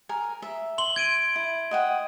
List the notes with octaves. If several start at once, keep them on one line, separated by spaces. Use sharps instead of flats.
A#4 G#5
E5
C6 F#7 G7
G#6 D7 D#7
E4
D#5 F#5 G5